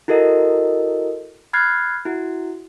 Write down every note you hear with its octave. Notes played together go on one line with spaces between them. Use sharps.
E4 F#4 A4 A#4 D#5
B5 F6 F#6 G#6 A6 C7
E4 F#4